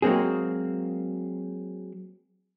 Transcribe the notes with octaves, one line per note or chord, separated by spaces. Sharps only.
F#3 G#3 A#3 C4 G#4